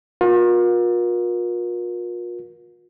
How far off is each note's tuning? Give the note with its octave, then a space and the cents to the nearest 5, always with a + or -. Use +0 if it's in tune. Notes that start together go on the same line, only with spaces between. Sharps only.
F4 +40 A#4 +35